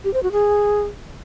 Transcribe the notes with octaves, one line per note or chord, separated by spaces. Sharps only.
G4
C5
F#4
G#4